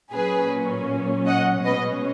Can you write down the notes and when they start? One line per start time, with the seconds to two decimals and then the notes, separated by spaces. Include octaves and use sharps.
0.12 A#2 F#3 C#4 G#4 B4
1.27 D#5 F#5
1.65 B2 G#3 C#4 B4 D#5